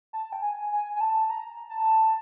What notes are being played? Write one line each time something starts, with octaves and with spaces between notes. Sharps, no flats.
A5
G5
G#5
G#5
G#5
A5
A#5
A5